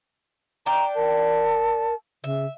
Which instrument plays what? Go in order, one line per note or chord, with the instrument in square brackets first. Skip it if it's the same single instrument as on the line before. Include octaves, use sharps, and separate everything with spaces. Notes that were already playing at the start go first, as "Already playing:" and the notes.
[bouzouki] D4 D5 G5 [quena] A#5
[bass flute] A#4 [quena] A5
[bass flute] C#3 [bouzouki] E5